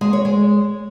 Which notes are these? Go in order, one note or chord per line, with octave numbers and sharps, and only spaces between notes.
G#3
C#5
G#3